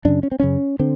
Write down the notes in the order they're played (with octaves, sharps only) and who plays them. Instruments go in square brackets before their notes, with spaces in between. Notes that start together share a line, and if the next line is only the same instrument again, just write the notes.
[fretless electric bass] F#2 C#3 D4
C#4
C4
F#2 C#3 C#4
D3 C4